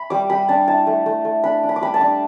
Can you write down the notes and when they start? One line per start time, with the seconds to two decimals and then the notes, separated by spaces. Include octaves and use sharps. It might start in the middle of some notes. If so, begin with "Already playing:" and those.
Already playing: B5
0.10 G3 D6
0.30 G3 B5
0.48 D4 A5
0.68 E4 A5
0.87 A3
1.06 A3
1.25 A3
1.44 D4 B5
1.63 D4
1.69 B5
1.76 D6
1.81 G3 B5
1.94 A5
2.01 D4